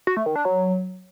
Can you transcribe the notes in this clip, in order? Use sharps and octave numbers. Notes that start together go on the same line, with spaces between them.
F#4
A3
D#3
D4
F#3